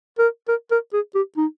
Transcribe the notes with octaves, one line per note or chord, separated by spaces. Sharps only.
A#4
A#4
A#4
G#4
G4
D#4